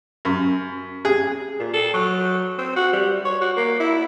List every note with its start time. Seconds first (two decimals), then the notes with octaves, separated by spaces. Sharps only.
0.25 F#2
1.05 G#4
1.60 A#2
1.73 A4
1.94 F#3
2.58 C4
2.76 F#4
2.93 G3
3.25 C#5
3.41 F#4
3.57 A#3
3.80 E4